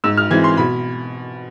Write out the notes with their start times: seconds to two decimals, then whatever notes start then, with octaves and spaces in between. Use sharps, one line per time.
0.04 G#2 E6
0.17 F6
0.31 E3 G#3 C4 G#6
0.44 C6
0.57 B2 B5